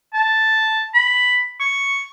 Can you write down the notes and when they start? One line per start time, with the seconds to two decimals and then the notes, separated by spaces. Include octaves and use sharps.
0.14 A5
0.94 B5
1.60 C#6